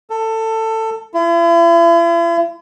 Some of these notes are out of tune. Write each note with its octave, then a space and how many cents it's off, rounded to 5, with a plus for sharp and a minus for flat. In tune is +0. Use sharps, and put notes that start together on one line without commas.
A4 +20
E4 +45